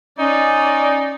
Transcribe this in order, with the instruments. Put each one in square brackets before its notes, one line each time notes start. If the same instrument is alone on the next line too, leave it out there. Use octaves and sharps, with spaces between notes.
[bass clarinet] C#4 [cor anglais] D#4 [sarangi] D5